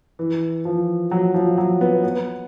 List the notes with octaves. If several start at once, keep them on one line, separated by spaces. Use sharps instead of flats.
E3
F3
F#3
F3
F#3
B3
B3